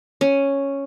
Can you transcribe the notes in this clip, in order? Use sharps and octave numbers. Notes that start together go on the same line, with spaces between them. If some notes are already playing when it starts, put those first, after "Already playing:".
C#4